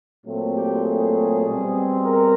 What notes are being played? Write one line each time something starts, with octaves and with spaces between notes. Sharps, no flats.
A#2 F#3 A3 C4
G4
G#4
B2 G3 C4
A#4